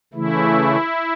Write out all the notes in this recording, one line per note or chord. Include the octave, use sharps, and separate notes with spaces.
C#3 E3 A3 E4